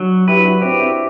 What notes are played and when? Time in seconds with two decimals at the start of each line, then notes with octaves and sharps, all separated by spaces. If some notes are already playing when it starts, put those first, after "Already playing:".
Already playing: F#3 D4
0.27 E4 G4 B4
0.44 D4 F#4
0.62 C4 E4 G4
0.79 C4 E4